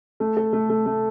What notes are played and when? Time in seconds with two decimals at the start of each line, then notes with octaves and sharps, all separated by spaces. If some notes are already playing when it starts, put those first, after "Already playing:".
0.20 A3
0.37 A4
0.53 A3
0.70 A3
0.86 A3